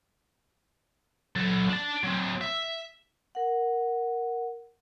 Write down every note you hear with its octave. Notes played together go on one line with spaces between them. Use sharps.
F#3 A4
D4 A5
F#3 C4
E5
A#4 F#5